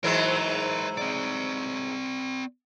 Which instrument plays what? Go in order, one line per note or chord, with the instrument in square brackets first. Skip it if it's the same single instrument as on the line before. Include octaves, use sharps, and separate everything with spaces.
[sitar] G#2 E3 F#3 [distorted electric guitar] A#4 C5
[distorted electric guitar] C4 D5